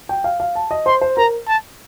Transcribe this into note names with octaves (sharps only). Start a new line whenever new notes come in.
G5
F5
F5
A5
D#5
C5 C6
C5
A#4 A#5
A5